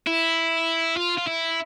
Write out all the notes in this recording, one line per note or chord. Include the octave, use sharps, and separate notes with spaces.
E4
F4
F4
E4